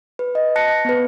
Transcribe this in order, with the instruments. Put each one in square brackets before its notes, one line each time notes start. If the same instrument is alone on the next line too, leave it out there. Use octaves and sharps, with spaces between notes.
[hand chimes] B4
D#5
A5 F#6 A#6 C#7
B3 B4